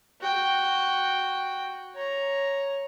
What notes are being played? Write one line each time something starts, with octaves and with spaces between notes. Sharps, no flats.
F#4 G5
C#5 A#5